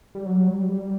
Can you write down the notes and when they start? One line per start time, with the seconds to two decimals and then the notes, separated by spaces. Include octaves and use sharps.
0.15 G3
0.26 F#3
0.48 G3
0.69 G3